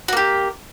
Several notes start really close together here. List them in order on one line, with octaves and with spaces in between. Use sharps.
F#4 A#3 G4